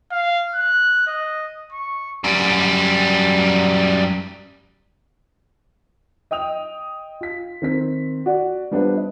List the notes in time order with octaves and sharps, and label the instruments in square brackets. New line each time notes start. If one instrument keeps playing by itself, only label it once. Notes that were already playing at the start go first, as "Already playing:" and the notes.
[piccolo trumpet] F5
F#6
D#5
C#6
[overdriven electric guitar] F#2 G3
[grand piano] D#5 G5 D#6 F7
F4 B6
D#3 C4 B6
F#4 D5
G3 B3 D4 F4 C5
D#5